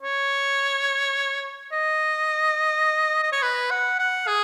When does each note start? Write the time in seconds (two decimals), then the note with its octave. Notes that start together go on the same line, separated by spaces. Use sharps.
0.03 C#5
1.72 D#5
3.23 D#5
3.32 C#5
3.42 B4
3.71 F#5
3.99 F#5
4.27 G#4